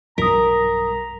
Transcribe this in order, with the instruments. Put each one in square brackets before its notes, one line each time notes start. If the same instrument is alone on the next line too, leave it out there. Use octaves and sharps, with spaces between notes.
[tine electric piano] B1 G2 G3 [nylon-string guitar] A#4 [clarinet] A#5 [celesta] D#6 B6